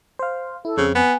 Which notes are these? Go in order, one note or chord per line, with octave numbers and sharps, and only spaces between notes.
C5 F5
E4 A4
F2 C#3 C4
B3 G#5